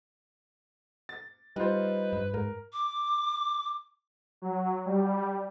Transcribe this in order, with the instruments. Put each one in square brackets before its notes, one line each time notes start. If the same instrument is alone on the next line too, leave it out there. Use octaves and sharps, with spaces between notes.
[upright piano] A6
[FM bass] G3 [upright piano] D#4 F4 C5 [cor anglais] B4
[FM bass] G2
[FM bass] G#2 [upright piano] A#4
[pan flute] D6
[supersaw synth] F#3
G3